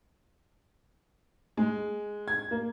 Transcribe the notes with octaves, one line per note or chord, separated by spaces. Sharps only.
G#3
G#6
A#3